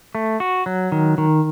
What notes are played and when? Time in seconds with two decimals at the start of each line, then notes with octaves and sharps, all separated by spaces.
0.15 A3
0.40 F#4
0.66 F#3
0.92 D#3
1.18 D#3